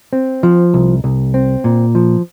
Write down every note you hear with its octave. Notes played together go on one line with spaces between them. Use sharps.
C4
F3
C2
C2
C4
A#2
F3